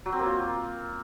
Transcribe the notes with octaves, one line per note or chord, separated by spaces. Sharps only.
F#3
C4
A#3
F4